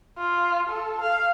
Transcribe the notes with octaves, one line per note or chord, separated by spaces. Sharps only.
F4
A4
F5